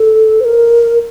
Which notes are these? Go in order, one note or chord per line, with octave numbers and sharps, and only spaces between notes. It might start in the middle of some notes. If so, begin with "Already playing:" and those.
Already playing: A4
C5
A#4